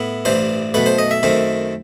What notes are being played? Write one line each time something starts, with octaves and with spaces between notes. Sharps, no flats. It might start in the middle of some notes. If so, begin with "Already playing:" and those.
Already playing: A2 B3 E4
A1 G2 E3 C5
B1 B2 A3 B4
C5
D#5
E5
F#2 D#3 A3 C4